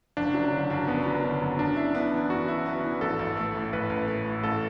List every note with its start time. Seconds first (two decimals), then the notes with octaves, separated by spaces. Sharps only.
0.17 F#1 D4
0.34 F#3
0.52 D3
0.70 F#2
0.88 F#1 B3
1.04 F#3 B3
1.24 D3
1.41 F#2
1.59 F#2 D4
1.76 E4
1.95 B3 D4
2.13 E3
2.30 F#2 F#4
2.48 E4
2.66 B3
2.84 E3
3.01 A1 A4
3.19 A1
3.37 A3
3.55 A2
3.73 A1 B4
3.90 A1
4.08 A3
4.26 A2
4.43 A1 A4